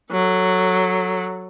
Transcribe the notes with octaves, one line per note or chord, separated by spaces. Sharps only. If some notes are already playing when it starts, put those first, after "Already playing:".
F#3 A4